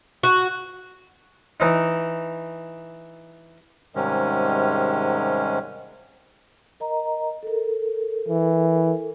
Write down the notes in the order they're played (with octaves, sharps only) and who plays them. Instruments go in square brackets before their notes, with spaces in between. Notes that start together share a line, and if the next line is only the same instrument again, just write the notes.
[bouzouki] F#4
[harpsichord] E3 D#4
[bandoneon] G#2 C3 D#3 G3 G#3 C#4
[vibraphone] A#4 D#5 A#5
A4 A#4
[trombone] E3